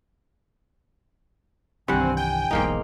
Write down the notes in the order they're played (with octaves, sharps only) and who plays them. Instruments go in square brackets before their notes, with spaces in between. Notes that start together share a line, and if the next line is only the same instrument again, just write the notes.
[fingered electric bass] C2 D#3 E3 [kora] G2 F#5 [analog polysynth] C4 [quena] G#5
[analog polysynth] G5 [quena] G#5
[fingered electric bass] E1 B1 E2 [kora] G#2 A#3 D#4